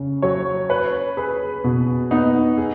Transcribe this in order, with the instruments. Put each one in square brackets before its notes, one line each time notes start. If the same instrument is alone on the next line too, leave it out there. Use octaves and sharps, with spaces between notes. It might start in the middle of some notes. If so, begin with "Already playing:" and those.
Already playing: [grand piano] C#3
[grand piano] F#3 [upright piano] C#5
[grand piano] B4 [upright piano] C#5
[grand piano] G#4 [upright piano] B4
[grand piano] B2
[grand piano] B3 [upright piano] D#4
[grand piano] G#4